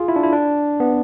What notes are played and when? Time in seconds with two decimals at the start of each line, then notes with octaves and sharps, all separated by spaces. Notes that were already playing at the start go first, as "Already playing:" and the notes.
Already playing: F4 G#4
0.08 E4
0.16 D4
0.23 E4
0.32 D4
0.80 B3